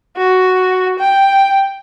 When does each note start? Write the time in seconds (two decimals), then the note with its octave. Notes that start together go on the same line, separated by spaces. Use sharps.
0.17 F#4
0.99 G5